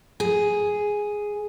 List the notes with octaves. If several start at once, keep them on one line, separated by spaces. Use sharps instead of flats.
G#4